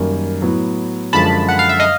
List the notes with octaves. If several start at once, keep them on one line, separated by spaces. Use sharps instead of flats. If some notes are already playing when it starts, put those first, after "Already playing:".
Already playing: F#2 D#3 G3 A#3
A2 F#3 B3
F#2 D3 F3 G#3 A5 B5
F#5
F5
E5
D#5 F5